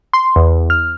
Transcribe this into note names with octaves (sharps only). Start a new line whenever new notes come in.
C6
E2
F6